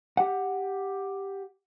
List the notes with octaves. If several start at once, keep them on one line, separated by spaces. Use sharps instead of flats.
G4 F#5